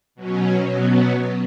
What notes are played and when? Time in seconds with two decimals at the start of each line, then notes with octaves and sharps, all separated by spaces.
0.15 B2 F#3 C#4
0.66 B2 F#3 B3